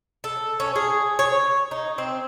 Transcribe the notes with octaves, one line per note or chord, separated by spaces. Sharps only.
A4
C#4
G#4
C#5
D#4
C4